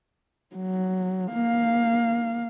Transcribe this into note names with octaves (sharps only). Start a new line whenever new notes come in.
F#3
A#3 F5